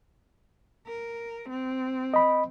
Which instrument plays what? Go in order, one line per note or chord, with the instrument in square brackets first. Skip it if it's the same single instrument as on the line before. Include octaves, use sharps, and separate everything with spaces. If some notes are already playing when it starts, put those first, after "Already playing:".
[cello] A#4
C4
[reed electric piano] D#5 B5